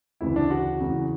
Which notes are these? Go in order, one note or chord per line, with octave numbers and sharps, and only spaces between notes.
D2 C#3 E3 E4
D4
F#4
E2 C#3 E3